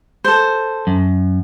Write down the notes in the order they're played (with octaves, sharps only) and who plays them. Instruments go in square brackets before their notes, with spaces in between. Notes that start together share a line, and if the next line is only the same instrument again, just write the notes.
[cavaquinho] A4 C5
[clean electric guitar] F#2